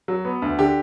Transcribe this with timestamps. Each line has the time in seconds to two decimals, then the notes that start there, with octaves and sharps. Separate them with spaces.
0.08 F#3
0.25 B3
0.42 D2
0.59 D3 G4